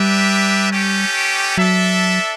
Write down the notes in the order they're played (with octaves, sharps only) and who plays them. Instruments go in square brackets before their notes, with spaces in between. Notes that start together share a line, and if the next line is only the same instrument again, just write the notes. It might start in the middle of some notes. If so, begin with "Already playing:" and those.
Already playing: [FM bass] G3 [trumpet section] D4 G4 B4 E5
[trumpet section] A3 C#4 G4
[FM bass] F#3 [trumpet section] D4 A4 E5